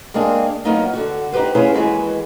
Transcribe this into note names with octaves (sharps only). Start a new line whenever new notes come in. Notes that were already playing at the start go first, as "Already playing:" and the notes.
G#3 A#3 C4 D4 G#4
F#3 A#3 B3 D#4 F4
D3 F#4
D#4 E4 G4 B4 C5
C#4 E4 F4 G#4 B4 C5
D#2 E3 G#3 F#4 G#4 B4